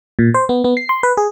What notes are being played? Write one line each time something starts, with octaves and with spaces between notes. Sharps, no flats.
A#2
C5
B3
B3
C7
C6
B4
G#4